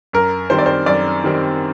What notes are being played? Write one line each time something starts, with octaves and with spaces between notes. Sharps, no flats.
F#2 A#4
D#3 G3 C4 C5
D5
C5
F#2 D5
D#3 G3 C4